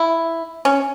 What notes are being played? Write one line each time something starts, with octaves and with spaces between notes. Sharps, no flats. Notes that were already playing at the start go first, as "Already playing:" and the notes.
Already playing: E4
C#4